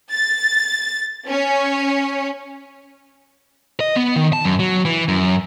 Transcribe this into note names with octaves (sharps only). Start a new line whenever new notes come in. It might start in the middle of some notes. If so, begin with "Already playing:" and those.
A6
C#4
D#5
B3
D#3
A5
F#2
F#3
E3
F#2